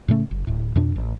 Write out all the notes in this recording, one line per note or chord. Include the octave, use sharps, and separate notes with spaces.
A2 C#3 A3 C#4
F#1
D1 A2
F2 B2 D4
A1